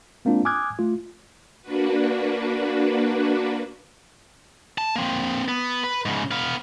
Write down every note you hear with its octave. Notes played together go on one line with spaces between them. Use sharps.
G#3 A#3 C4 D4 F4
G#5 D6 D#6 F6 F#6 G#6
A3 F4
A#3 D4 F#4 B4
A5
A#3 C4
B3
B4
G#2 C#3
B3 F5